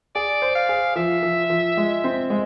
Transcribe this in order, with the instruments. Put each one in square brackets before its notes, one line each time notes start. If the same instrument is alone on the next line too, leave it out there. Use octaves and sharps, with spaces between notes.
[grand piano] G#4 [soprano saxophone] D5
[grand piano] C5
[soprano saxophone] F5
[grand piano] G#4
[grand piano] F3 [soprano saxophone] E5
[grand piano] F3
F3
G#3
C4
G#3